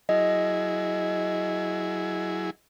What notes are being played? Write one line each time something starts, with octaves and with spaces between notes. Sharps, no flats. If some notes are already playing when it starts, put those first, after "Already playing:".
F#3 E4 G#4 D#5